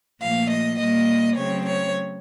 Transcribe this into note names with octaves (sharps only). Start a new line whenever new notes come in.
A#2 F3 A3 F5
D#5
A#2 G3 A#3 D#5
C#3 F#3 A3 C4 C#5
C#5